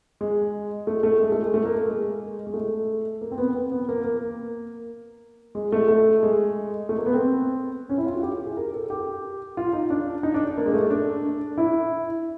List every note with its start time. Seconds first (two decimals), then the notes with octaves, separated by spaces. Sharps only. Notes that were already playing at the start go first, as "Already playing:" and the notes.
0.21 G#3
0.87 A3
1.03 A3
1.20 G#3
1.32 A3
1.43 G#3
1.54 A3
1.65 A#3
1.88 G#3
2.47 G#3
2.54 A3
3.21 A#3
3.31 C4
3.38 B3
3.54 C4
3.72 B3
3.89 A#3
4.04 A#3
5.55 G#3
5.72 A3
5.88 A3
6.23 G#3
6.89 A3
6.98 A#3
7.06 B3
7.14 C4
7.90 C#4
7.98 E4
8.06 F4
8.15 F#4
8.23 G4
8.45 G#4
8.57 A#4
8.74 A4
8.90 G4
9.57 F4
9.73 D#4
9.90 D4
10.23 D#4
10.34 D4
10.58 A#3
10.66 G#3
10.74 A3
10.90 D4
11.58 E4